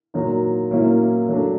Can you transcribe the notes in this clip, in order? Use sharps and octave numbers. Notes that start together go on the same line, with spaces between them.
A#2 F#3 A#3 D#4
A#2 F#3 A#3 C#4 E4
F#3 A3 D4